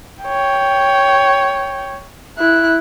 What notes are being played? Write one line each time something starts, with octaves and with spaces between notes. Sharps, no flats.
C#5 G5
E4 F#6